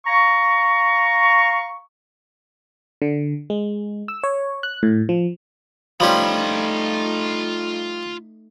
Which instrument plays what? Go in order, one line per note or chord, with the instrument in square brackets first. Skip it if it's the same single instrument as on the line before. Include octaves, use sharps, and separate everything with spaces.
[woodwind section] F5 A#5 C#6
[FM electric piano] D3
G#3
E6
C#5
F#6
A2
F3
[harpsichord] F3 G3 C#4 [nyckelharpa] A3 D#4 [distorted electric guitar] F4 B5